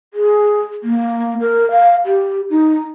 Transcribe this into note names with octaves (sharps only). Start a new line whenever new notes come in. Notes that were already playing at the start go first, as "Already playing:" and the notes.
G#4
A#3
A#4
F5
G4
D#4